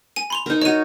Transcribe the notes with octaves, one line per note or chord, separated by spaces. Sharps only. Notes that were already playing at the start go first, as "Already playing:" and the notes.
G#5 D#7
B5 C6 F7
D#4 A#4
F#4 C#5 D#5 D#7